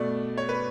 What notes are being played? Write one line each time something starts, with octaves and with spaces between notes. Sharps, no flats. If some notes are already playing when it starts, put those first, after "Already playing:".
Already playing: B2 A3 D5
C#5
B4